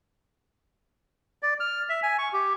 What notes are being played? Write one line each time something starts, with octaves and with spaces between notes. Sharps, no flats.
D5
F6
E5
G#5
C#6
G4